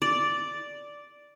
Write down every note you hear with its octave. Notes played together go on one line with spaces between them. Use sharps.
D5